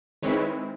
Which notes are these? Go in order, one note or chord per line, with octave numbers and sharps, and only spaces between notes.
D#3 G#3 C4 E4 B4 C#5